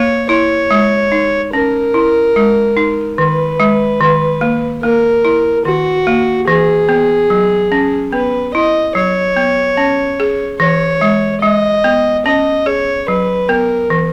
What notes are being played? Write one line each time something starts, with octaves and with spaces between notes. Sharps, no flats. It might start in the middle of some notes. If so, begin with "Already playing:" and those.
Already playing: A#3 C#5
E4 C#5
G#3
D#4
C#4 A#4
E4
G#3
D#4
D#3 B4
G#3
D#3
A#3
A#3 A#4
E4
D#3 F#4
A#3
E3 G#4
B3
F#3
C#4
B3 B4
E4 D#5
F#3 C#5
B3
C#4
G#4
E3 C#5
G#3
G#3 D#5
B3
C#4 D#5
G#4 C#5
F#3 B4
B3 A#4
E3